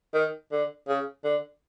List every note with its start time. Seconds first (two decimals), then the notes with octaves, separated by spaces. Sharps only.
0.14 D#3
0.52 D3
0.88 C#3
1.25 D3